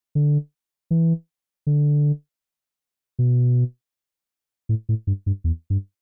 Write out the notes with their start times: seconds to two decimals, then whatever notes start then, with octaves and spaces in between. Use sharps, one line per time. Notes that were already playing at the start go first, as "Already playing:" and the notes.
0.15 D3
0.91 E3
1.67 D3
3.19 B2
4.69 A2
4.89 A2
5.07 G2
5.26 G2
5.44 E2
5.70 G2